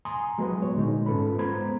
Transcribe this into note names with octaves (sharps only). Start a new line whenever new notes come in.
G#5 A#5 C6 D#6
F#3 G#3 B3 F#4 G#4 B4
C#5
A#2 D3 G#3 D#4
G#2 C#4 F4 A4 B4 B5
G#3 B3 C5 A#5 B5 G#6